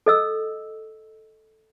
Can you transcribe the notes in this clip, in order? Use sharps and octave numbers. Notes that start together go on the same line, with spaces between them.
A4 D#5 E6